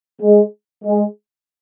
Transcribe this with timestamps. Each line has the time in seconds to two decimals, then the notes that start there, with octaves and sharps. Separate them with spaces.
0.22 G#3
0.85 G#3